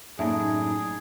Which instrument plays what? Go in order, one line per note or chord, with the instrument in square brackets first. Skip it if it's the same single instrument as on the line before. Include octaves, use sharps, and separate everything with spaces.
[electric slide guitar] F#2 A2 D4 [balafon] A#3 E5 [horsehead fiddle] D#4 [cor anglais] G#4